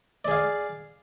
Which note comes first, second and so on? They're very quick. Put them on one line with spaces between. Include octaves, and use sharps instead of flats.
D5 G#4 F5